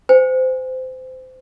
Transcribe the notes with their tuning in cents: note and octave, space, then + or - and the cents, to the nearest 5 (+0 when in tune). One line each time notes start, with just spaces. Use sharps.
C5 -25 G#5 -25